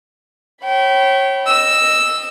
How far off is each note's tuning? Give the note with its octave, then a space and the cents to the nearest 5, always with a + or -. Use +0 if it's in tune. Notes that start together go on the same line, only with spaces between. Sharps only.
C#5 -25 G5 -30 B5 +0
D#5 -10 E6 +0